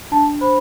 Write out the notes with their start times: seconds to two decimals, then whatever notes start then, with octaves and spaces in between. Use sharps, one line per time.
0.11 D4 A5
0.41 C5 B5